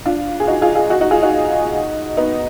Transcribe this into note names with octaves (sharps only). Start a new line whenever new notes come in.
D4 F4
G#4
D#4 F#4
F4 G#4
F4 G#4
D#4 F#4
D#4 F#4
F4 G#4
D#4 F#4
B3 D#4